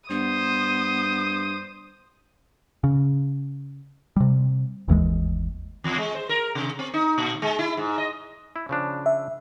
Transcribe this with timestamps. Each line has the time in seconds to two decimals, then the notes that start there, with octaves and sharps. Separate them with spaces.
0.10 G2 B3 C5 D#6
2.84 C#3
4.16 C3 G3
4.88 G1 D#2 E3 G#3
5.84 E2
5.98 G#3
6.15 C5
6.29 A#4
6.55 C3
6.79 C4
6.94 D#4
7.18 A#2
7.42 G#3
7.59 E4
7.77 G#2
7.98 D#5
8.56 E4
8.69 C#3 F3 D4
9.06 E5